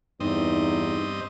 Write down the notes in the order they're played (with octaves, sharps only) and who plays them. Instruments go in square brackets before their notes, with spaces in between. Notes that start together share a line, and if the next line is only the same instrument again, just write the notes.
[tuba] E2 [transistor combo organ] G2 C4 D#5 [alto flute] D#4